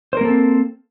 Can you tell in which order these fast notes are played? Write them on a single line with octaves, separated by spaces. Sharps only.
C5 A#4 A#3 A4 C4